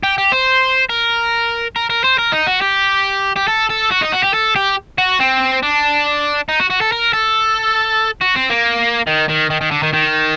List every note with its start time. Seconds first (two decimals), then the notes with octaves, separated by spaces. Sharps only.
0.03 G4
0.18 G4
0.32 C5
0.90 A#4
1.76 A#4
1.90 A#4
2.04 C5
2.19 A#4
2.33 D#4
2.47 F#4
2.61 G4
3.36 G4
3.48 A4
3.69 A4
3.91 F#4
4.01 D#4
4.12 F#4
4.23 G4
4.34 A4
4.56 G4
4.98 F#4
5.20 C4
5.63 D4
6.49 D#4
6.60 F#4
6.70 F#4
6.81 A4
6.92 A#4
7.13 A4
8.21 F#4
8.35 C4
8.50 A#3
9.07 D#3
9.29 D#3
9.50 D#3
9.61 D#3
9.71 D3
9.83 D#3
9.93 D#3